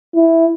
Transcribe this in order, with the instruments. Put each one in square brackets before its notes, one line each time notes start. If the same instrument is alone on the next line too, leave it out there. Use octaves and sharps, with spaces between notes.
[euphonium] E4